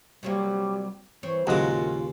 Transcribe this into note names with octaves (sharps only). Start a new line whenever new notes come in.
C3 F#3 G3 A#3
E3 C4 C#5
D#2 A#2 C#3 F#3 G#3 F4 F#4 A#4